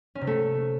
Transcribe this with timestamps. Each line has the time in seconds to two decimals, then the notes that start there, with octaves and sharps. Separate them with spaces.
0.15 C#4
0.21 C3
0.27 A3